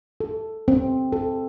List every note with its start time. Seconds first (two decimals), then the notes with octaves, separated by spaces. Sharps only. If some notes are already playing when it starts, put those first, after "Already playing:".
0.20 A4
0.68 C4
1.12 A4